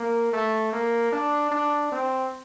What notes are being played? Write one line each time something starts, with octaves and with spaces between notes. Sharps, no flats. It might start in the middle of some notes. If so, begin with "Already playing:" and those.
Already playing: A#3
A3
A#3
D4
D4
C4